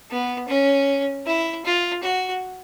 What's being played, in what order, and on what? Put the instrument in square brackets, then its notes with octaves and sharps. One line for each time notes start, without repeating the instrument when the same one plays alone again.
[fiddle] B3
C#4
E4
F4
F#4